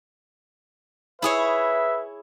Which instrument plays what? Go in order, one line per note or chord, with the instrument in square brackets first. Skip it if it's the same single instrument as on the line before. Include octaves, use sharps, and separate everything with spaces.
[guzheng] E4 G#4 C#5 [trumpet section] B4 E5